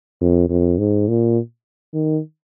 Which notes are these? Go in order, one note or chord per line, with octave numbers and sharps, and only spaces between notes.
F2
F2
G#2
A#2
D#3